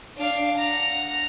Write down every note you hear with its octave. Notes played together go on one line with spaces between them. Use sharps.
D4 F5
F#5 A#5